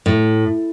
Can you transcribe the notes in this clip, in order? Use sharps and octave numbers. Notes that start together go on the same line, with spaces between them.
A2